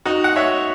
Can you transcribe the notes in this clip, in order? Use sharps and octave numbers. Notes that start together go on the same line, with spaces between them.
D#4 F#4
F#5
C#5 E5